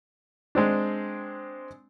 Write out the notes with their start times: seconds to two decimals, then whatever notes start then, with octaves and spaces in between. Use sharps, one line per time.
0.55 G#3 C4 D4